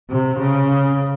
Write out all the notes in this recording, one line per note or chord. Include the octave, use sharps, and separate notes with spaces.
C3
C#3